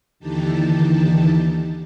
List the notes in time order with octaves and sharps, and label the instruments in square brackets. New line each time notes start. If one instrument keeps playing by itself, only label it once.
[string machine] D#2 D3 E3 D#4 G4 A5